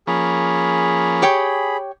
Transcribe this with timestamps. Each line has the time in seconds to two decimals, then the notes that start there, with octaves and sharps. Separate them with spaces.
0.07 F3 A#3 C#4 G#4 B5
1.22 G4 C#5 G5